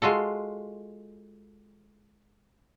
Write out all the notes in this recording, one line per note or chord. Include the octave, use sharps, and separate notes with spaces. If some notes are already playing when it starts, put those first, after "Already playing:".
G#3 F4 F#4 A4